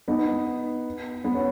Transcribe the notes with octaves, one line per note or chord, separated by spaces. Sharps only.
B3 D#4
B3
C#4